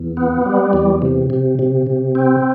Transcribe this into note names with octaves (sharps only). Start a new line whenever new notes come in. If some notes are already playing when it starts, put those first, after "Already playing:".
Already playing: E2
B3
G3
E2
C3
C3
C3
C3
C4